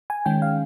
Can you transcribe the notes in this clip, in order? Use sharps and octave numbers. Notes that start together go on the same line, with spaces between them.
G#5
D#3 G#3 C#4 G5
F5